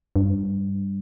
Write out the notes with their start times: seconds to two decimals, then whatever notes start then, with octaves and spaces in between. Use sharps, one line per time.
0.16 G2